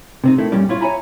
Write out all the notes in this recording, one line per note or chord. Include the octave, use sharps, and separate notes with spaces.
C3 C4 D#4
D#3 A3 E4
G2 A#2 G3 C#4 D5
E4 F4 C#5
C#5 D5 E5 G#5 A#5 B5